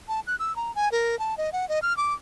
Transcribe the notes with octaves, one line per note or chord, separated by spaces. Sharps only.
A5
F#6
E6
A#5
G#5
A#4
A5
D#5
F#5
D#5
F6
D6